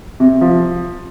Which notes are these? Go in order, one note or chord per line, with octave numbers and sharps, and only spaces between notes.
C3
F3